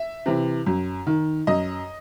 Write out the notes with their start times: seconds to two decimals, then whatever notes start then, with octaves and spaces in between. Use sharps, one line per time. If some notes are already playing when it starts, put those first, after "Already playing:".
Already playing: E5
0.26 C3 E3
0.67 F#2
1.06 D#3
1.47 F#2 D#5